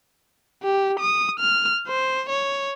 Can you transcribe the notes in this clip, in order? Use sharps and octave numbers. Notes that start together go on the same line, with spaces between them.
G4
D#6
F6
C5
C#5